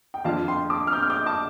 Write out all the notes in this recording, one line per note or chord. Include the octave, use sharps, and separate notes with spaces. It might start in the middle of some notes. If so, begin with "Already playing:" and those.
G5
F2 F3 D4 F4 F5 A5
G5 C6
A5 D6
F6
D6 G6
F6
D6 G6
A5 D6